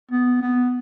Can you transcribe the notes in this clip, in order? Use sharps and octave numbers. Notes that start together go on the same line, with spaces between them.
B3
B3